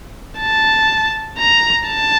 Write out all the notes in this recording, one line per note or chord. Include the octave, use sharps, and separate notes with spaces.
A5
A#5
A5